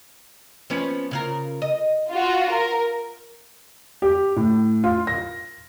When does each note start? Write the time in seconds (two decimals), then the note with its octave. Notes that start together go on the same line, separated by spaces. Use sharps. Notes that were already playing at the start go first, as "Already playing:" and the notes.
0.70 F3 B3 C#4
1.11 C#3 F4 A#4
1.62 D#5
2.11 F4 F#4
2.52 A#4
4.02 G4
4.36 A2
4.84 F4
5.07 A#6